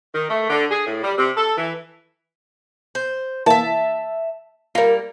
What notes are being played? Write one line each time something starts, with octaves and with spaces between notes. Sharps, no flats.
D#3
A3
D3
G#4
A2
G3
C3
A4
E3
C5
E3 A#3 E5 A5
G3 A#3 F4 A#4